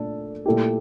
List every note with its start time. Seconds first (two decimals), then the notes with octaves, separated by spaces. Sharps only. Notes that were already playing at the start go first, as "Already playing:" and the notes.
Already playing: A#2 A3 D4 A4
0.46 A#2 A3 E4 G4